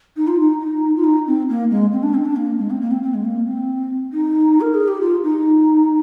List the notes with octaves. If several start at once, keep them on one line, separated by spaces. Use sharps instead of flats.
D#4
F4
D#4
D#4
F4
D#4
C4
A#3
G#3
C4
D4
C4
D4
A#3
G#3
C4
A#3
C4
C4
G#3
A#3
C4
D#4
A#4
G#4
G4
F4
D#4